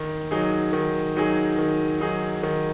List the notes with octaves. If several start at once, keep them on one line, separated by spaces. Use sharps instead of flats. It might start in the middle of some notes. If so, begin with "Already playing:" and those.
Already playing: D#3
F#3 D#4 G#4
D#3
F#3 D#4 G#4
D#3
F#3 D#4 G#4
D#3